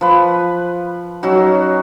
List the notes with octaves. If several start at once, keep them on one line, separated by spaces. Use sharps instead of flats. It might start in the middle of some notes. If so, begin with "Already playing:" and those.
F3 B4
F#3 C#4 D#4 F#4